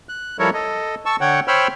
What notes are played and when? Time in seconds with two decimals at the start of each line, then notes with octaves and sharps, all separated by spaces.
0.09 F#6
0.39 F3 G3 E4 A4 A#4 C#5
0.54 A4 D#5
1.06 A5 C#6 E6
1.21 D3 C#5 F#5 G5
1.48 C5 C#5 G5 B5 E6 F6